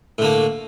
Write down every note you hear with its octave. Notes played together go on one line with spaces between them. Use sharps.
A2 D3 A#3